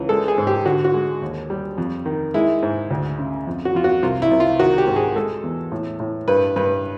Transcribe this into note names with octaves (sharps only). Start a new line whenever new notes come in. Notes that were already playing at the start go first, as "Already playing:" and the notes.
Already playing: C#2 E3
G#3 A4
G#4
G#2
G4
D3 F#4
F#4
G#3
D#2
G3
F2
D#3
G#3 E4
G#2
D2
C#3
F2
F#4
F2 F4
F#4
C2 F4
E4
C2
F4
D#3 F#4
G4
G#2
G#4
G#3 A4
E2
A2
A2
G2 B4
G2 B4